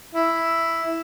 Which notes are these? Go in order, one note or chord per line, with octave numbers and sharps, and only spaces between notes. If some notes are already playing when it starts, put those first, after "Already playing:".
E4